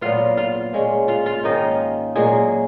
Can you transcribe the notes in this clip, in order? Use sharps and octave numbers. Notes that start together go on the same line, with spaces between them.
A#2 F#3 B3 F4 F5
F4 F5
A#2 G#3 C#4
F4 F5
F4 F5
G#2 D#3 A#3 C#4 D#4 D#5
A#2 F#3 G#3 A#3 C#4 G#4